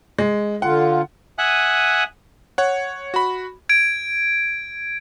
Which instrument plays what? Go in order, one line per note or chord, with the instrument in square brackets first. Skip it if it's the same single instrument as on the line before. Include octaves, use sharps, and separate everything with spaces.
[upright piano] G#3
[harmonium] D3 F4 [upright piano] F#5
[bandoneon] E5 F#5 G#5 D#6 F#6
[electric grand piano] C#5 F#5
F#4 B5
[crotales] G#6 D7